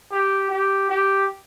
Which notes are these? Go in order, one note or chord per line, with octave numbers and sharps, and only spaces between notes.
G4
G4
G4